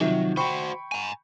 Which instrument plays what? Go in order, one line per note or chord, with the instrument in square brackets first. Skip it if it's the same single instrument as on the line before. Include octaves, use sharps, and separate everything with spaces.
[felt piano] C3 D#3 F3 [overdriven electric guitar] F#3
[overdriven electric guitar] F#4 C5 [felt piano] G5 B5 C#6
[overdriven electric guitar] G#5 A#5